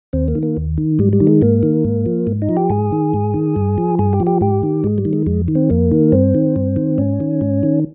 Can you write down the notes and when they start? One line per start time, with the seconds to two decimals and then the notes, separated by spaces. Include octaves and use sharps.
0.13 D#2 C4
0.28 A#3
0.35 D#3
0.43 A#3
0.57 D#2
0.78 D#3
0.99 G#2 G3
1.13 G3
1.20 D#3
1.27 G#3
1.42 G#2 A#3
1.63 D#3
1.84 G#2
2.06 F3
2.27 G#2
2.42 D#4
2.49 F3
2.57 G4
2.70 G#2 G#4
2.92 D#3
3.14 G#2
3.34 D#3
3.56 G2
3.78 F3
3.99 G2 G#4
4.13 G4
4.20 F3
4.27 G4
4.41 G#2 G4
4.63 D#3
4.84 G#2 G#3
4.98 G3
5.05 D#3
5.13 G#3
5.27 F2 G#3
5.48 D#3
5.55 C4
5.70 F2 A#3
5.91 D#3
6.12 G2 C4
6.35 D#3
6.56 G2
6.76 D#3
6.98 G#2 C#4
7.20 D#3
7.41 G#2
7.63 D#3